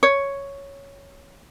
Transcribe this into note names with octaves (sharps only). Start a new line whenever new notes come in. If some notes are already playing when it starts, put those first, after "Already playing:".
C#5